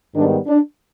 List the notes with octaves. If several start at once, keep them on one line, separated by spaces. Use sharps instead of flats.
G#2 D#3 G3 B3 D4
D4